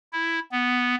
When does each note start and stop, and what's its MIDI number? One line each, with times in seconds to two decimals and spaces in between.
0.13 0.39 64
0.52 0.95 59